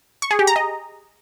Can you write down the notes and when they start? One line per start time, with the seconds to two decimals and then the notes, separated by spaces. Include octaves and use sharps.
0.22 C#6
0.31 G#4
0.39 G4
0.47 A#5
0.56 D#5